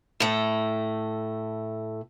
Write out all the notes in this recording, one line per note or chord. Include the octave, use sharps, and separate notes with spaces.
A2 A3